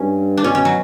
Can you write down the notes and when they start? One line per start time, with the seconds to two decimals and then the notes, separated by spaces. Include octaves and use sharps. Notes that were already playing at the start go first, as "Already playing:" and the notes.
Already playing: G2 C#4
0.37 D4
0.44 B2 C#4
0.55 C#4
0.65 F#3